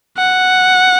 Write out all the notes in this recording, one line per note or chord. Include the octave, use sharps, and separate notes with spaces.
F#5